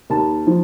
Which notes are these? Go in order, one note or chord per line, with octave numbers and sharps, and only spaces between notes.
D#2 A5
F3